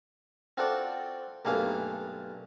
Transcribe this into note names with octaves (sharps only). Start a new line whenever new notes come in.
C4 F4 F#4 A4 D5
B1 G2 A3 A#3 G#4 F5